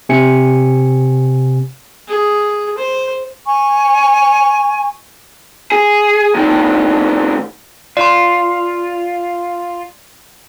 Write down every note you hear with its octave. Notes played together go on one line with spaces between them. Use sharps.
C3 G#5 C#7
G#4
C5
G#5 C#6
G#4
A2 D#3
F4 D5 C6